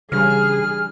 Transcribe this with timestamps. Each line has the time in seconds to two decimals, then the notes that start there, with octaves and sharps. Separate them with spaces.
0.12 C#3 E3 G3 D4 G#4 F6